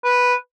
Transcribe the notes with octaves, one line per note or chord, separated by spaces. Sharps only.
B4